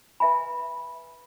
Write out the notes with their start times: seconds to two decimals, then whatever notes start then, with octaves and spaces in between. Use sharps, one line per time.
0.20 B4 E5 G#5 B5